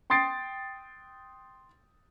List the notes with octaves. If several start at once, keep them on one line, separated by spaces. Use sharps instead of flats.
G5 C6 D#6 A6 C7 D7